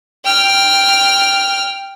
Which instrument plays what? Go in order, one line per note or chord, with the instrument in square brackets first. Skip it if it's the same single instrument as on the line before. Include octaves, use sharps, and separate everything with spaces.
[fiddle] G5 F6